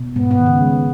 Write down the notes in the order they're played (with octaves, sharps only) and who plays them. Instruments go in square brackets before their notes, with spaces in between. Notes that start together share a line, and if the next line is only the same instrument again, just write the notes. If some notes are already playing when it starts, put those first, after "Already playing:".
Already playing: [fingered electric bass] B2
[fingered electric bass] G#2 [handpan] B3
[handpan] B3
[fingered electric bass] D#3
[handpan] C#3
[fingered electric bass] G#3